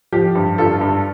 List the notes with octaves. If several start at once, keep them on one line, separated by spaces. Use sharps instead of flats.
F3 G4
G2
G2 F4 A4
G2